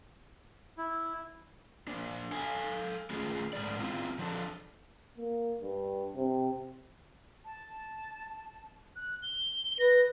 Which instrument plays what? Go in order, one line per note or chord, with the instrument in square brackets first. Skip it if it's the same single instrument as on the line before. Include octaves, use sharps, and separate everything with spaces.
[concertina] E4
[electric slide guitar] A#3 D4
A4 F5 G#5
A3 C#4 F4 G#4
G#2 G#3 A3 D5
C4 E4 F4
F3 D4 A4
[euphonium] A#3
G2
C3
[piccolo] A5
F#6
G7
[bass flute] B4 [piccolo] A#6